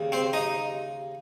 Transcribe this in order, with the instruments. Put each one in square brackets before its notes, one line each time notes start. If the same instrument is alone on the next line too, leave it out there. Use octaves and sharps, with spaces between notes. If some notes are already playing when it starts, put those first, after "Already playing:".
Already playing: [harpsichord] D#2 C#3 G3
C4 C5
D#4 D#5